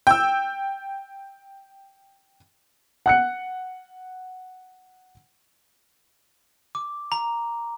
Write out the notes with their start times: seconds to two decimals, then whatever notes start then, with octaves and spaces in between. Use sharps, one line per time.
0.07 G5 E6
3.06 F#5 F#6 C#7
6.75 D6
7.12 A#5